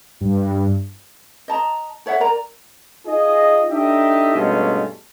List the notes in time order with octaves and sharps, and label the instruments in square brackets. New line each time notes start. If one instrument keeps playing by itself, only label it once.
[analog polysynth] G2
[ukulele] D#5 A5 A#5
A4 C#5 E5 F#5
A#4 D5 A#5
[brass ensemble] D#4 F4 G#4 D#5
D4 D#4 G4 A4 D#5 E5
G2 B2 G#3 A3 C#4 F4